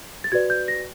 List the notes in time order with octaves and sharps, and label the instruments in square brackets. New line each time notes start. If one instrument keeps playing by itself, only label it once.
[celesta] A6
F#4 B4 D5 G#6
G6
A#6